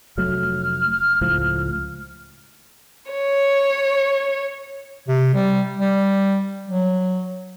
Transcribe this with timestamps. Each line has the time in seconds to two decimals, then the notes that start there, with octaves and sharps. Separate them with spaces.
0.18 F1 F#3 A3 F6
1.21 C#2 A2 F3
3.12 C#5
5.08 C3
5.34 G3
5.79 G3
6.69 F#3